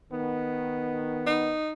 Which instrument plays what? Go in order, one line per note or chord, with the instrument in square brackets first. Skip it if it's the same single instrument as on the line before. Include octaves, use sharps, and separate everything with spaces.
[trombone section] D#3 B3
[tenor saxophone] D#4